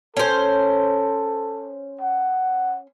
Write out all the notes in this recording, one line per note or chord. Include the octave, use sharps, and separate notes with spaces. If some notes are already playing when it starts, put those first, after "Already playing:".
C#4 A4 C5
F#5